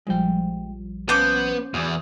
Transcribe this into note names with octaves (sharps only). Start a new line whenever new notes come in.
A#1 F3 G3 G#3 G5
B3 C#4 C5 F5 A5 D6
E2 F#4 D5 E5